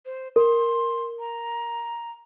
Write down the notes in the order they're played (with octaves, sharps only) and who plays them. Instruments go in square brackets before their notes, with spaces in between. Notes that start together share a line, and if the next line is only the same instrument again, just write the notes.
[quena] C5
[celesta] A#4 [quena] C6
[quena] A#5